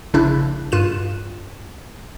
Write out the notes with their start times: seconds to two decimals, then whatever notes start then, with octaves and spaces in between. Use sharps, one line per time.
0.14 A#1 C#3 D4 E4 F#6
0.72 G2 F4 F#6 D#7 E7